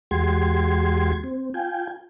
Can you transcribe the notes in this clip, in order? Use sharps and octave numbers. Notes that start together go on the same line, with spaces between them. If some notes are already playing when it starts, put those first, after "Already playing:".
E2 G#3 F#4 G4 C6 G#6
C4
F4 G5 G#5